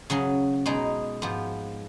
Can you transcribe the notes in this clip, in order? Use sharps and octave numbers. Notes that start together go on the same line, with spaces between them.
C#3 F#3 C#4
B2 G#3 D#4
G#2 F3 B3